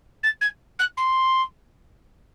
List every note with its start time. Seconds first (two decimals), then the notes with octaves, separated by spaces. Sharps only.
0.23 A6
0.41 G#6
0.79 F#6
0.97 C6